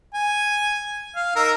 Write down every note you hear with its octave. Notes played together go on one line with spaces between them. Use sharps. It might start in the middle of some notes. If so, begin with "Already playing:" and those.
G#5
F5
D#4 A#4 E6